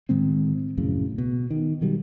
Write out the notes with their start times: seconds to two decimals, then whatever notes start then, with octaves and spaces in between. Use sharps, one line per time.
0.09 A2 D#3 G#3 C4
0.77 A#1 F#2 A2 C#3
1.18 B2
1.50 D#3
1.81 B2 D#3 F#3 G3